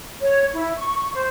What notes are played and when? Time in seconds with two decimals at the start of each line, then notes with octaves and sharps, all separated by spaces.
0.21 C#5
0.55 E4
0.76 C#6
0.98 C#6
1.13 C5